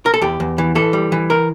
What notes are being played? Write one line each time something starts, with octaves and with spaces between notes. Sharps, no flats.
A#4
A4
E2 G4
E2
E3
E3 A4
G3
E3
A#4